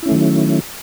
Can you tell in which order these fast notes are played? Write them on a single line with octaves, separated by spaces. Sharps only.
E4 C#4 A3 D#3 F#3